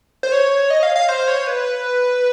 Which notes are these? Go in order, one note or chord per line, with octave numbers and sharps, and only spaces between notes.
C5
C#5
D#5
F5
F5
C5
C#5
B4